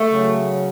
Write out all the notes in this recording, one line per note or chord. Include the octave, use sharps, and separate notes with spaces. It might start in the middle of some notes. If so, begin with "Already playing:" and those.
Already playing: A3
C#3 F#3